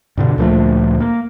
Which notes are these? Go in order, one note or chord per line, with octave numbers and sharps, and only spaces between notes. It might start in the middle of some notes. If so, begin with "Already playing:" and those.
G2 B2 D3
D2 A#2 F3 A3
A#3